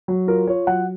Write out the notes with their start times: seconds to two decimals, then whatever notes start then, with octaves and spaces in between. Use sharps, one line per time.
0.08 F#3
0.28 F4 A#4
0.47 F4 C#5
0.67 F#3 F#5